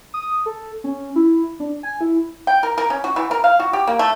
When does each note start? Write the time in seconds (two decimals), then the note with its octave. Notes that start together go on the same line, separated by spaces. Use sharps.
0.14 D#6
0.46 A4
0.84 C#4
1.16 E4
1.60 D4
1.83 G#5
2.01 E4
2.47 G5
2.63 A#4
2.78 A#4
2.90 C#4
3.04 F#4
3.16 E3
3.31 A#4
3.44 F5
3.60 F#4
3.73 G4
3.87 A#3
3.99 A3